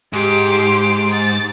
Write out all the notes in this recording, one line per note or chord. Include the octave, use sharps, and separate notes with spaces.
G#2 G4 C6 D6
A6